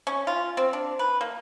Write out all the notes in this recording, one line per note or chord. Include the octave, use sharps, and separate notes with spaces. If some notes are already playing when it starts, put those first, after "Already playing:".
C#4
F4
C4
D4
B4
A#3